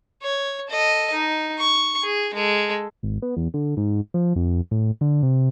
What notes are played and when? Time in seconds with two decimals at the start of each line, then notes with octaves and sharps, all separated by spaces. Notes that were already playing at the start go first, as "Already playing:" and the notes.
0.22 C#5
0.69 A4 D#5
1.13 D#4
1.59 C#6
2.03 G#4
2.34 G#3 A4
3.03 G#1
3.22 B3
3.37 E2
3.54 D3
3.77 G#2
4.14 F3
4.36 F2
4.71 A2
5.01 D3
5.23 C3